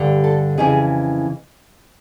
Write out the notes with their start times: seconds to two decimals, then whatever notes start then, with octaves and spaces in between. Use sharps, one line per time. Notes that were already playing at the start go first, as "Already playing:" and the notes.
Already playing: G2 D3
0.24 A4
0.58 F2 C#3 E3 G#4